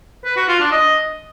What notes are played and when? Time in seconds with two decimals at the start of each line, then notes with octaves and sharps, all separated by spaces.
0.25 B4
0.37 F#4
0.48 F4
0.60 D4
0.72 D#5